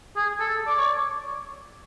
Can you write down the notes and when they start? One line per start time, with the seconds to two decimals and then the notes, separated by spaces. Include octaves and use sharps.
0.16 G#4
0.40 A4
0.67 D5
0.79 C#5